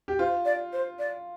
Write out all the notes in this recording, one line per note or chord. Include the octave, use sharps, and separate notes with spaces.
G4
F4 C5
D5
C5
D5